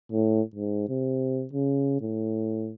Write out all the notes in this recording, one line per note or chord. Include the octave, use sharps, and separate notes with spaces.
A2
G#2
C3
C#3
A2